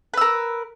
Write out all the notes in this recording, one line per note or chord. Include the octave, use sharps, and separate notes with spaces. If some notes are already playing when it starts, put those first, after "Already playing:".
A#4 B4 E6